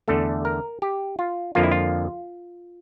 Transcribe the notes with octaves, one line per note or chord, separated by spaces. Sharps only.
E2 D3 A3 A4
A#4
G4
F4
F2 D3 F3 A#3 F4
E4
F4